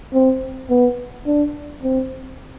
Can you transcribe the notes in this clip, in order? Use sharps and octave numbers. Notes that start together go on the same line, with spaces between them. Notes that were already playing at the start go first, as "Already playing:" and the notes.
C4
B3
D4
C4